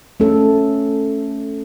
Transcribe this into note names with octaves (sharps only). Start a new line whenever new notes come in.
A3 C#4 A4